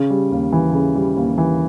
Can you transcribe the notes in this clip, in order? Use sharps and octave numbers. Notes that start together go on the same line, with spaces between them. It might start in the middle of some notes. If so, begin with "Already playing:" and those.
Already playing: C#3
G3
D#2
E3
C#3
G3
D#2
E3